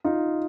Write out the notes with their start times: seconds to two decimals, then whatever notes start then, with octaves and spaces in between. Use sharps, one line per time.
0.04 D#4 F4